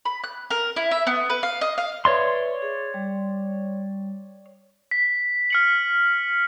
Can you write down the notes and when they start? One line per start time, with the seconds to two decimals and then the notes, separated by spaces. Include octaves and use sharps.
0.05 B5
0.24 F#6
0.51 A#4
0.76 E4
0.91 E5
1.07 B3
1.30 B4
1.43 F5
1.61 D#5
1.78 F5
2.05 B4 C#5 D5 E5 C6
2.62 G#4
2.94 G3
4.91 B6
5.50 F6 C#7 F#7